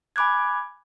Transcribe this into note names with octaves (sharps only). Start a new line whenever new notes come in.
G#5 B5 D6 F#6 G#6